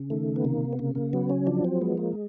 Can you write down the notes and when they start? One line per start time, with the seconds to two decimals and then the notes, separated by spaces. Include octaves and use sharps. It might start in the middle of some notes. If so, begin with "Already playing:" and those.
Already playing: C#3
0.10 D#3 A3
0.36 B3
0.44 C3 A#3
0.73 B3
0.79 C#3 A#3
0.95 A#3
1.13 F#3 B3
1.30 C#4
1.47 F3 D4
1.65 C4
1.81 G#3 B3
1.97 A#3